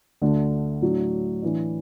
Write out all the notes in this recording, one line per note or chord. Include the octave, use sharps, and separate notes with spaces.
D2 D3 A3 D4
A2 F#3 D4
A2 E3 D4